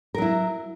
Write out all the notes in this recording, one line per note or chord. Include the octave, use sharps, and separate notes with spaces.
F#3 E4 A#4